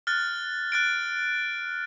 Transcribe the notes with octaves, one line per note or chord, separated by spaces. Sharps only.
F6 F#6 A6
F#6 A6 D7